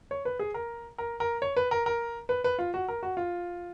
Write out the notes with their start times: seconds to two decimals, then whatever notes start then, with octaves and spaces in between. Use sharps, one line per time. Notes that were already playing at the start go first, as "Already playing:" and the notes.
0.11 C#5
0.25 B4
0.39 G#4
0.54 A#4
0.98 A#4
1.20 A#4
1.42 C#5
1.57 B4
1.71 A#4
1.86 A#4
2.29 B4
2.44 B4
2.59 F4
2.74 F#4
2.88 A#4
3.03 F#4
3.17 F4